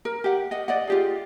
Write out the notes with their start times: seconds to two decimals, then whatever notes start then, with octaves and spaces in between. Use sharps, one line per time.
0.05 A#4
0.24 G4 F#5
0.51 D#5 F#5
0.68 D5 D#5 F#5
0.88 F4 G4 G#4